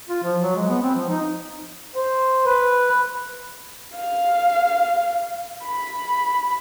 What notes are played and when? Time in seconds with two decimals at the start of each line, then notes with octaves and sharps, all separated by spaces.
0.08 F4
0.23 F3
0.41 F#3
0.56 G#3
0.69 B3
0.82 C4
0.94 F3
1.09 D#4
1.95 C5
2.46 B4
3.97 F5
5.66 B5